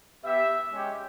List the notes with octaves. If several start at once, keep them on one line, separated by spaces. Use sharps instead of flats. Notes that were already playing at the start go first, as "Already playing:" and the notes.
B3 G4 E5
G#3 C#4 G4